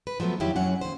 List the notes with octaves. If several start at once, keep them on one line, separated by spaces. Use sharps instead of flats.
B4
F3 F#3 A3 B3
F2 D#3 F#3 E4 G4
F#2 F#3 C#4 F#5
D#2 C5